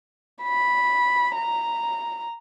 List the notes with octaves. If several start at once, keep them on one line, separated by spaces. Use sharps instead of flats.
B5
A#5